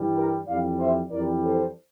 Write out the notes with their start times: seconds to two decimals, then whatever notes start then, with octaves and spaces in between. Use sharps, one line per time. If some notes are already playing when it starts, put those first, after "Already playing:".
Already playing: G2 E3 G3
0.14 G4 A#4
0.46 F2 E3 G3 D5 F5
0.79 C5 E5
1.10 F2 E3 G3 A#4 D5
1.43 A4 C5